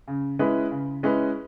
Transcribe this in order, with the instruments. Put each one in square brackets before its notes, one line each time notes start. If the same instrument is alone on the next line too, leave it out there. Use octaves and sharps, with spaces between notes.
[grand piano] C#3
G#3 C#4 E4 B4
C#3
G#3 C#4 E4 B4